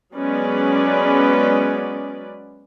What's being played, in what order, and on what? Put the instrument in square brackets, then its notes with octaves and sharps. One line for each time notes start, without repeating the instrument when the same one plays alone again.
[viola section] F#3 G#3 B3 C#4 B4 D5